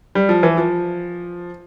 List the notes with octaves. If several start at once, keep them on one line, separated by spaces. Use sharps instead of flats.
G3
F3
E3
F3